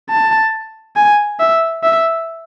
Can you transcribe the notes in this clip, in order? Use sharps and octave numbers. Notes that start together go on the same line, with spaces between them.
A5
G#5
E5
E5